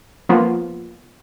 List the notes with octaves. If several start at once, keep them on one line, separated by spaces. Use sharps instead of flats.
F3 A#3 B3 F4